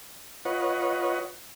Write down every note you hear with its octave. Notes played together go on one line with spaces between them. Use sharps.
F4 B4 C#5 D#5 F#5